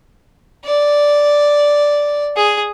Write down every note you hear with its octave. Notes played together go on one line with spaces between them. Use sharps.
D5
G#4